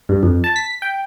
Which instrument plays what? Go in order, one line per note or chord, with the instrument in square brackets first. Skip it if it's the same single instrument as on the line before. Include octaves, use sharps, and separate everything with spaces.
[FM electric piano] G2
F2
A5
B6
G5